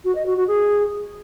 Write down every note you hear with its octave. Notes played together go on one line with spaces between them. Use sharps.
F#4
D#5
F#4
F#4
G#4